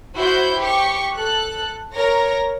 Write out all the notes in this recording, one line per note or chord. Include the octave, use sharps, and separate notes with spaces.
E4 F#4 C5 G6
G4 C#6
A4 F#6
A#4 C#5 A#6